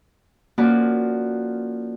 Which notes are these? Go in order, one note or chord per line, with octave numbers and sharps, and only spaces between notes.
F3 A#3 C#4 F#4 B4 D5